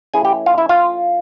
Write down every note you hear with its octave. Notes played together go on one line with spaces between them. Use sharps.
E3 A3 C#4 E4 G#4 G#5
G4 G5
F4 F5
E4 E5
F4 F5